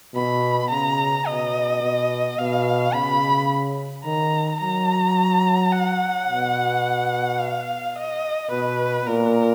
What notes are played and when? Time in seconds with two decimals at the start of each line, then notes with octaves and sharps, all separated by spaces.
0.15 B2 B5
0.71 C#3 A#5
1.27 B2 D#5
1.82 B2
2.38 B2 F5
2.94 C#3 B5
4.05 D#3 A#5
4.61 F#3 A#5
5.72 F#5
6.29 B2
7.39 F5
7.95 D#5
8.51 B2 B4
9.07 A#2 A#4